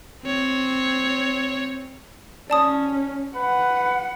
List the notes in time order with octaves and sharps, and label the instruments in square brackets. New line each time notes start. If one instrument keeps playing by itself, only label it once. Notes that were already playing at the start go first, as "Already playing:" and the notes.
[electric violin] C4 C#5
[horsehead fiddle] C#4 [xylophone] D5 A5 D#6
[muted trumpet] B4 [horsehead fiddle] F#5